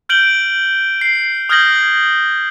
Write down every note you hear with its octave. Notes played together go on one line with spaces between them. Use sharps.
F6 G6 D7 F#7 G7
C7
D#6 F6 G6 G#6 A#6 F#7